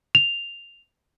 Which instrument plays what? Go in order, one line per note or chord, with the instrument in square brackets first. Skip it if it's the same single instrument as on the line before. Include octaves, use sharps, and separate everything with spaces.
[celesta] F7